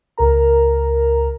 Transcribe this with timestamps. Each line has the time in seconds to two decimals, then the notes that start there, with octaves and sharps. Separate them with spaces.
0.18 C#2 A#4 A#5